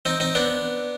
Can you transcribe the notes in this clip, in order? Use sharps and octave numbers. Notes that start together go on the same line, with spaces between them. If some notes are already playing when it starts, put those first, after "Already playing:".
C4 D#4
C4 D#4
B3 D4